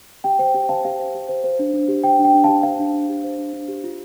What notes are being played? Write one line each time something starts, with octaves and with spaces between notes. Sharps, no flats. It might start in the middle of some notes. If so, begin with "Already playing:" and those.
G4 G5
C5 G5
G4 G5
C5 F5 A5
G4 F5
C5
G4
C5
C5
D4
D4
G4
C5 G5
D4
G5
D4
G4 F5 A5
C5 F5
D4
D4
G4
C5
D4
D4
G4
F4